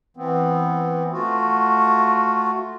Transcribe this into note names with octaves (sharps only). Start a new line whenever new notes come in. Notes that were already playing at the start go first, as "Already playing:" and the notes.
E3 B3 C4
A3 F4 F#4